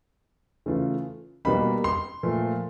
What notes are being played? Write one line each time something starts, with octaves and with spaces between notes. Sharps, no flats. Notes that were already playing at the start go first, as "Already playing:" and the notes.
C#3 E3 A3 C#4 F4
B2 G3 A#3 D#4 B5
C6
A#2 F3 A3